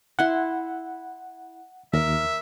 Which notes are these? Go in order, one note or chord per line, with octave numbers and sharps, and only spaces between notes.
E4 F#5 C6
D#2 A#4 E5